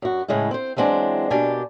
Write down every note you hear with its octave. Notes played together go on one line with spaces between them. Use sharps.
F#2 F#4
A2 C#3 G#3 A3 E4
C4 C5
E3 F#3 G#3 C4 D4
B2 A#3 D4 G4 D5 G#5